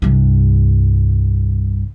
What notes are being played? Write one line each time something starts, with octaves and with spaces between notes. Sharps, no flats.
C2 G2